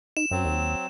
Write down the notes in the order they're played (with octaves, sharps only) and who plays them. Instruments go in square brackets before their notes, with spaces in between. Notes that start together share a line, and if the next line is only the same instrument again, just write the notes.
[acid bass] D#4 [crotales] E7
[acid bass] F#2 [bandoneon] F#3 C4
[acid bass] D#2